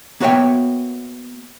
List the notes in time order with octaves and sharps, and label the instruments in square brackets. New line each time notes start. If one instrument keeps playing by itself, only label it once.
[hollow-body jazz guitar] A#3 B3 F#4 C#5 E5 G5